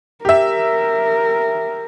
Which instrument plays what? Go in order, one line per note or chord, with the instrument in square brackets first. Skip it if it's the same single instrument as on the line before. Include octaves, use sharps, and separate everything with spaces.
[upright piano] G4 E5 [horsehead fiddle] A#4